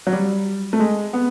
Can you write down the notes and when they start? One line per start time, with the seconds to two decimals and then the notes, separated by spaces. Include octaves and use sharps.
0.07 F#3
0.13 G3
0.73 A3
0.80 G#3
1.13 B3